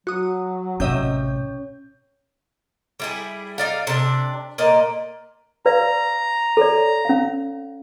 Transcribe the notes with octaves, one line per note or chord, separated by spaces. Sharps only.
F#3 F#4 D#6
A1 C3 C#4 C#5 D#5 E5 G6
G3 E4 G#4
D#4 D5 F5
C3 D4
A#2 A#3 D5 D#5
B4 D5 F5 A#5
A4 C#5 D5
C#4 F5